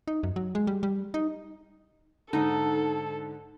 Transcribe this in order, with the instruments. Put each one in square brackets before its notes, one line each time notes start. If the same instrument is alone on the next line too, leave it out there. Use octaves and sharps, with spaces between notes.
[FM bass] D#4
F#2
F#3
G#3
G3
G3
D#4
[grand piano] G#2 D3 [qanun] D#4 [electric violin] A4